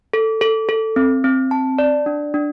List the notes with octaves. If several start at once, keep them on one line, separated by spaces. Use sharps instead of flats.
A4
A4
A4
C4
C4
A5
D5
D4
D4